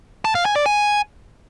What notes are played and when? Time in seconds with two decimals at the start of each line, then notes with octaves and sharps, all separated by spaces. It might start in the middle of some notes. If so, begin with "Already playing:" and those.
0.25 A5
0.35 F5
0.45 G#5
0.56 D5
0.66 G#5